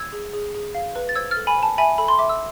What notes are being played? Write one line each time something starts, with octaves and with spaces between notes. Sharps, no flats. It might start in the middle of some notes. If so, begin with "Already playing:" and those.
Already playing: E6 G#6
G#4
G#4
G#4
F5
B4
A6
C5 E6 G#6
F6 A6
A4
G#5 B5
C5
A5
E5 G#5 B5
A4 B5
C6
E5 D6
E6